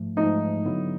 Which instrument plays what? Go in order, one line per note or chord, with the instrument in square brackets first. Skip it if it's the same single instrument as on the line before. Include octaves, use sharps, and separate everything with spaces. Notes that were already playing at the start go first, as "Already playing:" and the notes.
Already playing: [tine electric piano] G#2 F3 A3
[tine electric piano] G#2 F3 A3 [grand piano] D#4
[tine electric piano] D3 F#3 B3 E4